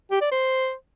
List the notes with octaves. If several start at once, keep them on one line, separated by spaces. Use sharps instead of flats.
G4
D5
C5